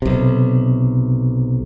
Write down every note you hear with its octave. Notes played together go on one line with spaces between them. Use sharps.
B1 C3